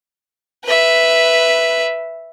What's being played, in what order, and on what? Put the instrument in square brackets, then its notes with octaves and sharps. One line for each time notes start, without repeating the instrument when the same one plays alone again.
[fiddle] B4 E5